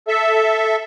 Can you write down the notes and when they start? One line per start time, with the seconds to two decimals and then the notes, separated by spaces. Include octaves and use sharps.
0.08 A4 E5